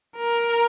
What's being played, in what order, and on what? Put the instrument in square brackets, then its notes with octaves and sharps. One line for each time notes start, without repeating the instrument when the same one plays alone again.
[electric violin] A#4